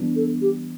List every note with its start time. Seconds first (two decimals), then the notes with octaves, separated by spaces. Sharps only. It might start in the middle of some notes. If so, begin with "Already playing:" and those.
Already playing: E3 G3 B3 D4
0.15 A4
0.41 G4